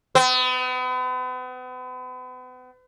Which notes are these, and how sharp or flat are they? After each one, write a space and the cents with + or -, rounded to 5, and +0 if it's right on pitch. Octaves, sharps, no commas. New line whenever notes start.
B3 +40